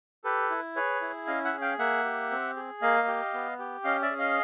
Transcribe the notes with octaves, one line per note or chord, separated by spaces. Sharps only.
G4 A4 B4
E4
G#4 B4 C#5
E4
C#4 D#5 F5
E5 F#5
G#4
F5 G5
A#3 E5 F#5
G4
C4
G#4
A#3 D#5 F5
G4
B3
G4
C#4 D#5 F5
D5 E5
G#4
D#5 F5